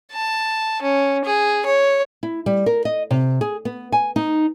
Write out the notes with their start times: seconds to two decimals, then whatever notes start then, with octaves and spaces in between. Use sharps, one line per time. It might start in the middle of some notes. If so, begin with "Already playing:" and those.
0.12 A5
0.82 C#4
1.25 G#4
1.66 C#5
2.23 E4
2.46 G3
2.66 A#4
2.85 D#5
3.11 C3
3.41 G#4
3.65 B3
3.92 G#5
4.16 D#4